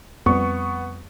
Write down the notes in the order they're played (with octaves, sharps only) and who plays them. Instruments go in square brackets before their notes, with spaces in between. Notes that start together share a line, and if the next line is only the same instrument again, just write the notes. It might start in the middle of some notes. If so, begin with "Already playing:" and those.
[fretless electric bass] F2 G3 [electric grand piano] B3 C#6